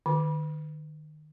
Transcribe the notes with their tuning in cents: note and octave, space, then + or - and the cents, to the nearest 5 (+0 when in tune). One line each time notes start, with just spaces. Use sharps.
D#3 -35 D6 +0